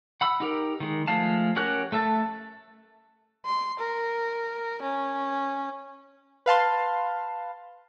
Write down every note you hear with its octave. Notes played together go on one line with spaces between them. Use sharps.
F#5 B5 E6
D#4 G4 A#4
D#3 G#3
F3 G#3 A3 F5 A5
C#4 F#4 G4 A#4 F#6
A3 A4 E5 A5
C6
A#4
C#4
B4 F5 A5 C6